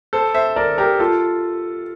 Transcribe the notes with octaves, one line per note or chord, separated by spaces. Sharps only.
A4 C5
C5 E5
A#4 D5
G4 A#4
F4 A4